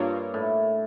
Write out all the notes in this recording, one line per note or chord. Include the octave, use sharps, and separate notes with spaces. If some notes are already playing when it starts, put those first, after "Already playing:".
Already playing: G2 A#3 D4 F4 A#4 C#5
A2